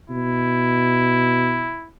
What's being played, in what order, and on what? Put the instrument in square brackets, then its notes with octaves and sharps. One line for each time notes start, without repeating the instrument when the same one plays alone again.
[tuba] B2 [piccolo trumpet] E4